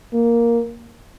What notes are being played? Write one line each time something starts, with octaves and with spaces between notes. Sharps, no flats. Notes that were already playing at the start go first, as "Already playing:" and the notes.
A#3